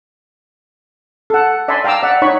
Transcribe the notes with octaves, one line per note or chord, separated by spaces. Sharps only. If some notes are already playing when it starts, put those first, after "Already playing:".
A4 F#5
D5 E5 G#5 A5 B5 C6
F5 G5 A#5 D6 E6
D5 E5 F#5
D#4 C#5 B5 C#6